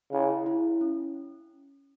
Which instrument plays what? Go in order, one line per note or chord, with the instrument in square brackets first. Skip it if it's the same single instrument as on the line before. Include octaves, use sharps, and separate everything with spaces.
[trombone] C#3 [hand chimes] E4
[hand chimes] E4
C#4